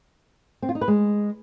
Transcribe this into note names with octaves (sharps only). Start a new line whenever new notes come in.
C4
F4
D#4
B4
G#3